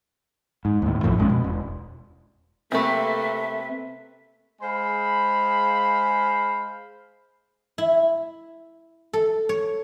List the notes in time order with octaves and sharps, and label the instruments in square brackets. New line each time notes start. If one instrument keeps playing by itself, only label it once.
[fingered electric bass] G#2
D#2 A2
B1 F#2 A2 F3
A#1 G#3 C#4
B2
E1
[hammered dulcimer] C3 B4 [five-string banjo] A3 C4 [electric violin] A#3 A4 [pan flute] E5
[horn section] G#3 G#4 C5 F5 B5
[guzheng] E4
A4
C#5